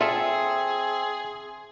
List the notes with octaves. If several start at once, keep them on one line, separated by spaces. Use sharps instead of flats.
C4 F4 G#4 A4 E5